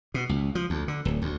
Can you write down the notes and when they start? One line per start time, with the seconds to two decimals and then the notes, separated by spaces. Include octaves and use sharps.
0.14 B2
0.29 C#2
0.55 F3
0.70 D2
0.88 D3
1.05 D1
1.22 D2